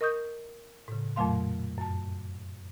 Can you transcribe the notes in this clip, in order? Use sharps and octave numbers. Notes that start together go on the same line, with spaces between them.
A#4 D#5 C#6 D#6 G6
A2 C#3
F2 A#2 F#3 A3 F5 C6
F#2 A5